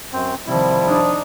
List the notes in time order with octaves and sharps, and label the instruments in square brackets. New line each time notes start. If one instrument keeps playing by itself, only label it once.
[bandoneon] F#2 C4
[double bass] C3 D#3 [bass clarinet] F3 [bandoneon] G3 E4
[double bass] D4 D#4